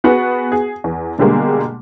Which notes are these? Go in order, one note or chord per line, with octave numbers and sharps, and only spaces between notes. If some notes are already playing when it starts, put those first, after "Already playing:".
B3 F#4 G#4 B4 F#5
G#4
E2
B2 D3 G3 G#3 A#3